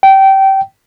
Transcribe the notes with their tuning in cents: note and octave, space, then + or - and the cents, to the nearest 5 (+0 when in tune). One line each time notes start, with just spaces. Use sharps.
G5 -20